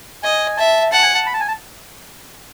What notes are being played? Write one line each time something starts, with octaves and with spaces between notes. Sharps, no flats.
D#5 G#5
E5 A5
F#5 A5
G#5
A5
B5
A5
G#5
A5